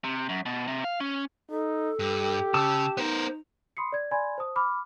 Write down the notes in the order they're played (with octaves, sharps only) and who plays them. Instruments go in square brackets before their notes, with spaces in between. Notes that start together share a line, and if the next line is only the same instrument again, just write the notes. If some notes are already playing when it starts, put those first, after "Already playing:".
[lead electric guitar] C3
F#2
B2
C3
F5
C#4
[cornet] D#4 [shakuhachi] A4
[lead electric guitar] G2 [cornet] G4
[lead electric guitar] C#3 [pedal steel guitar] A5 D6 E6
[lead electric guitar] B3 A#4 [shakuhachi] D#4 [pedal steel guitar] C5
[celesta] B5 C6 D#6 C7 C#7
D5 G#6
D5 G#5 B5 C6 G#6
C5 A5 D#6
B5 D6 F6